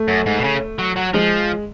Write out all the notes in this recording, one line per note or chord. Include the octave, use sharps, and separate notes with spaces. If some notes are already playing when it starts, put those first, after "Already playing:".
Already playing: A3
F#2
G#2
B2
C#3
F#3
F#3
F3 G#3